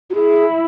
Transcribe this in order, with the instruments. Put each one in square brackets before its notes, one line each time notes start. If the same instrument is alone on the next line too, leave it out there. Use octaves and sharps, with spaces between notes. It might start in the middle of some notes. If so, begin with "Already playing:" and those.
[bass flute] F#4
[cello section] E4 [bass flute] G#4